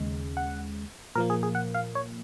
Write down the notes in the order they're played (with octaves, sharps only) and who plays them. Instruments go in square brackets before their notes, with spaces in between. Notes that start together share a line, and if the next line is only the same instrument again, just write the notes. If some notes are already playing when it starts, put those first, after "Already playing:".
Already playing: [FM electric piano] D#2 C#3 G#3
F#5
A#2 F3 A#3 A#4
G#4
G#4
F#5
F5
C#5